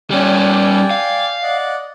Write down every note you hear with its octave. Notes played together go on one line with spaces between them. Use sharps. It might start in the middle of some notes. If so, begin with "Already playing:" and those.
G3 C#4 D5 G5 G#5
F5
D5 D#5 F#5